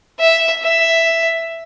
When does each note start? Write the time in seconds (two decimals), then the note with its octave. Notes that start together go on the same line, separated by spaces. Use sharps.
0.20 E5
0.63 E5